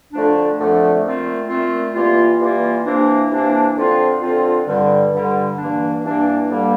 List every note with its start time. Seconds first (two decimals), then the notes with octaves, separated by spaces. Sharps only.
0.13 F2 D3 F3 A3 D4
0.58 F2 D3 F3 A3 D4
1.04 A#2 A3 C4 F4
1.49 A#2 A3 C4 F4
1.95 E3 G3 A#3 F4
2.40 E3 G3 A#3 F4
2.85 C3 E3 A#3 D4
3.30 C3 E3 A#3 D4
3.76 D3 F3 C4 F4
4.21 D3 F3 C4 F4
4.67 G2 D3 G3
5.12 G2 D3 G3
5.58 G2 E3 A#3 D4
6.03 G2 E3 A#3 D4
6.49 G2 D3 G3 A#3